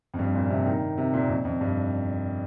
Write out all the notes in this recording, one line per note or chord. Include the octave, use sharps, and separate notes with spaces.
F2
G2
A#2
C3
D#3
C3
A#2
F2
F2
G2